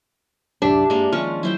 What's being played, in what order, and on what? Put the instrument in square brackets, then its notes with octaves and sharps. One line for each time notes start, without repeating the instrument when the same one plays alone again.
[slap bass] C2 F#2 A2 [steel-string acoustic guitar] D4 [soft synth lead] G4 [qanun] E5
[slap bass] G2 [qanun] G#3 A#3 [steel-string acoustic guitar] D4
[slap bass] D#3 [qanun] F3 C#4 C#6 [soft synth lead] F6
[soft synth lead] F#3 [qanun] E4 C5 G5